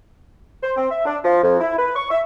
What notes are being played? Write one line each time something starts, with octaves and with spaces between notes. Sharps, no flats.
C5
C4
E5
D4
F3
F2
E4
B4
C#6
E5